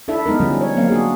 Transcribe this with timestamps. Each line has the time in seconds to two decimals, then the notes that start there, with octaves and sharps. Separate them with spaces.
0.08 D4 E4 A4 E5
0.26 G#3 B3 D#4 A#4
0.40 D3 F3 G3 G#3 C#4
0.61 C#5
0.76 F#3 A#3 C4 F5
0.90 D4 F#4 G#4